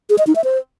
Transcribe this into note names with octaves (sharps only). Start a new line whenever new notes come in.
G#4
D#5
D#4
E5
C5